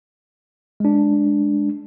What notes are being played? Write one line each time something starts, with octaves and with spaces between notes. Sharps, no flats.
G#3 D4